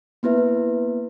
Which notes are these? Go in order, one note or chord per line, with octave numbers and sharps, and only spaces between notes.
A#3 B3 E4 B4 E5